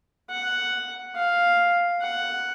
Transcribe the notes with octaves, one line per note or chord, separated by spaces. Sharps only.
F#5
F5
F#5